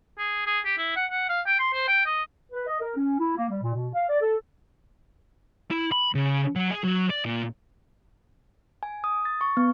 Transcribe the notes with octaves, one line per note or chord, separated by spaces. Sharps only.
G#4
G#4
G4
E4
F#5
F#5
F5
G5
C6
C5
G5
D#5
B4
D#5
A#4
C#4
E4
A#3
G3
A#2
B2
F5
D5
A4
E4
B5
C#3
F#3
G#4
F#3
D5
A#2
G#5
D#6
A6
C#6
B3